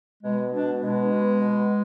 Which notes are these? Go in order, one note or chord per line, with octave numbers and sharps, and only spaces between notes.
B2 G#3
B2 D4
B2 G#3
B2
B2